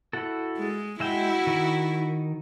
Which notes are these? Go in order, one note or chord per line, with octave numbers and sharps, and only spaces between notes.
E4 F#4 A4
G#3
G#3 E4 F#4 E5 G5
D#3